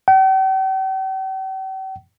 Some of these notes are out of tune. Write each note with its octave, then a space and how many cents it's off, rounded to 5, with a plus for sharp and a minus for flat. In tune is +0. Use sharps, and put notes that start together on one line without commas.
G5 -45